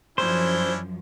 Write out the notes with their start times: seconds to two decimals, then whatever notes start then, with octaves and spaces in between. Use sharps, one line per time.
0.18 F#2 F3 C#4 D4 E4 C5